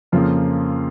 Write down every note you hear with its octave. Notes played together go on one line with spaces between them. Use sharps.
F2 C#3 F3 A#3 F4